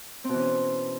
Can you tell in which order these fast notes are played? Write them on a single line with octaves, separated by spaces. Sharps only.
C4 B2 E3 C#4